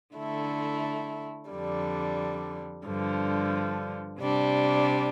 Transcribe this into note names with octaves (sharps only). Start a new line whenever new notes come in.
D3 A3 E4
F2 D3 G3
G2 D3 F3
C3 G3 D4